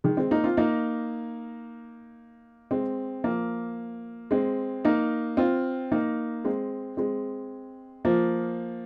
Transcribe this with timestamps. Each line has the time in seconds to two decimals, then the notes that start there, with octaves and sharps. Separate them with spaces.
0.04 D#3 G#3
0.17 G#3 C4
0.31 A#3 D#4
0.44 C4 F4
0.57 A#3 D#4
2.71 G#3 C4
3.24 F3 A#3
4.31 G#3 C4
4.85 A#3 D#4
5.37 C4 F4
5.92 A#3 D#4
6.45 G#3 C4
6.97 G#3 C4
8.05 F3 A#3